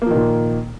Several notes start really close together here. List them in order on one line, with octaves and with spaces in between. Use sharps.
A#3 F3 D#3 A#2